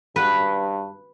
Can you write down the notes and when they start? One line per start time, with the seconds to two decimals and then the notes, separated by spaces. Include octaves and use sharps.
0.16 G2 B4